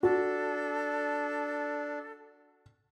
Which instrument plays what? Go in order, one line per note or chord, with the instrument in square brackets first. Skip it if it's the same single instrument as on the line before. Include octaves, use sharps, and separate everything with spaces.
[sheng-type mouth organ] D4 [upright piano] F#4 [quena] A4